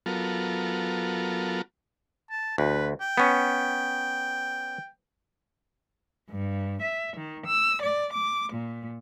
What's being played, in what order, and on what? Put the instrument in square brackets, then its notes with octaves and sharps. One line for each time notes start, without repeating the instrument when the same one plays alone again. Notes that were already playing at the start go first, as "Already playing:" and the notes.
[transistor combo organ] F#3 B3 F4 A4 A#4
[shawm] A5
[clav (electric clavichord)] D2 [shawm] B4
[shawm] G5
[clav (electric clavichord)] B3 C#4
[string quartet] G2
E5
D#3
E6
D5
D6
A#2